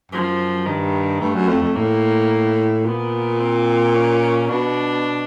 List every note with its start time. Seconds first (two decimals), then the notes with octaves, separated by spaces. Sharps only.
0.12 F#2 F3
0.66 G2 D#3
1.21 G2 A3
1.35 F#2
1.48 F2
1.62 F2
1.76 A2 A#3
2.85 A#2 B3
3.40 C4
3.94 C#4
4.48 B2 D4